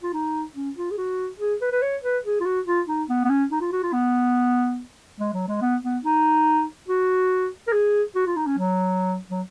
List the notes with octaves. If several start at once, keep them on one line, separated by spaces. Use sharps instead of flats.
F4
D#4
C#4
F4
G#4
F#4
G#4
B4
B4
C#5
B4
G#4
F4
F#4
F4
D#4
B3
B3
C#4
D#4
F4
F#4
F4
B3
G#3
F#3
G#3
B3
B3
D#4
F#4
A#4
G#4
F#4
F4
D#4
C#4
F#3
F#3